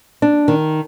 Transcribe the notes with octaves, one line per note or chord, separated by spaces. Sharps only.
D4
D#3